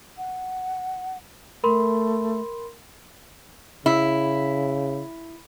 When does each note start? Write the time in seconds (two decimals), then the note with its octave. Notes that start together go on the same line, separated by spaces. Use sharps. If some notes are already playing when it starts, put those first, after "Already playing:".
0.18 F#5
1.64 A3 A#4 B5 C6
3.86 C#3 E4